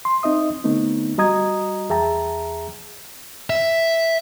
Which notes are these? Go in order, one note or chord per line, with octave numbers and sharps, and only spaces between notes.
C6
C4 D#4 D#5 E5 D#6
D3 A3 B3 C4 D#4
G3 F#4 D#5 A#5 D#6 G#6
E2 G#4 E5 G5 A5 A#5
E5